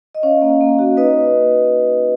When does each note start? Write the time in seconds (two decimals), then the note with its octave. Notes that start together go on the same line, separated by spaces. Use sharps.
0.15 D#5
0.23 C#4 C#5 F5
0.42 A#3
0.61 A#3
0.79 F#4
0.97 D#4 B4 D#5